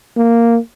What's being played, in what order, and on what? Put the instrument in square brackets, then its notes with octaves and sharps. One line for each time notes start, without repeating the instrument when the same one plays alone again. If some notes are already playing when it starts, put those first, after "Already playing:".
[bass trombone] A#3